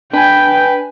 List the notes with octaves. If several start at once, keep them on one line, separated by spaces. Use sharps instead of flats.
D4 B4 G5 G#5